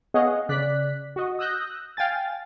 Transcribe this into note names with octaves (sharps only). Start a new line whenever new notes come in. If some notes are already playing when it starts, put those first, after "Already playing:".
B3 G#4 C#5 D#5 F5 F#5
C#3 D5 F#6 B6
F#4 D#5
D#6 E6 F#6 G6 A#6
F5 G5 G#5 A6